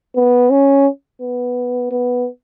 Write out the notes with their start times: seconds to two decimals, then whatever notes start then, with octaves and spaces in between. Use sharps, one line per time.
0.16 B3
0.51 C#4
1.21 B3
1.91 B3